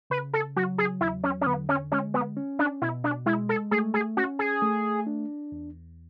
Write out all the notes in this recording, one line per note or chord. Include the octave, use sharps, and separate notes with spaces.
C#3 B4
A4
F#3 F#4
G#4
E2 E4
C#4
C#4
D3 B3
C#4
G#3 C#4
B3
C#4
D4
B2 E4
D4
G#3 E4
A4
A3 G#4
G#4
C#4 F#4
G#4
A3
D4
E2